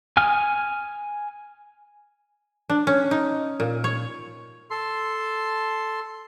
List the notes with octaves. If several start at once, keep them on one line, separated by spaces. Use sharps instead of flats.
G#5 D#6 F6
D4
C#4
D#4
A#2
C#5
A4 C6